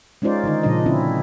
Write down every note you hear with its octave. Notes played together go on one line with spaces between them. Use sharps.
G#3 C#4 D#4 F4 C5 D5
D3 D#3 D#4
A#2 C#3 F3 D4 D#5
D3 C4 C#4 E4